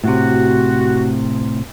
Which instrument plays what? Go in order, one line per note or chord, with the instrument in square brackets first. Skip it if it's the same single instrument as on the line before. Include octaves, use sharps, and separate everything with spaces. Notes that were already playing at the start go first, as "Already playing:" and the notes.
[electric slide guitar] A2 C3 [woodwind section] F#4